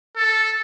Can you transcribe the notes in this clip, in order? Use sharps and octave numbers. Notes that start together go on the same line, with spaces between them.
A4